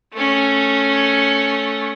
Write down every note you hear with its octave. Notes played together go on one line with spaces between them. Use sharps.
A3 C#4